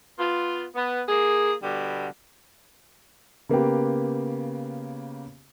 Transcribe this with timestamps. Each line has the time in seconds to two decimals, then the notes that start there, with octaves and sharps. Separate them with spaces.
0.18 B3 F4
0.75 B3
1.08 A#3 G#4
1.62 B2 D3 G3
3.49 C#3 A#3 B3 G4